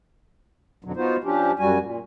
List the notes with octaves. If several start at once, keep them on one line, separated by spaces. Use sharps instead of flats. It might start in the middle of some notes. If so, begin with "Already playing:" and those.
F2 B2 D3 F#3
B3 D#4 F4 F#4 C5
F3 C#4 D4 G4
F#2 G3 F#4 G#5
A#2